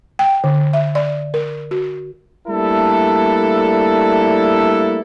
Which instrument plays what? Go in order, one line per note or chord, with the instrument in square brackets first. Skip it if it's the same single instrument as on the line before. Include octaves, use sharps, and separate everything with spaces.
[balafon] G5
D3
E5
D5
A#4
F#4
[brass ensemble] G3 A3 A#3 D4 E4 A4